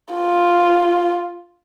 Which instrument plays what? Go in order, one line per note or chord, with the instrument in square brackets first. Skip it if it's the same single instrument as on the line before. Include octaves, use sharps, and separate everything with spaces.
[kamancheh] F4